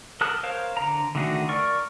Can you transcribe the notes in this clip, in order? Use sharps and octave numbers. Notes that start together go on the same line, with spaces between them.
A4 A#4 A5 D#6 F#6
A#4 C5 C#5 F5
D3 A#5
D3 D#3 A3 F#4 G#4
A#4 D5 C#6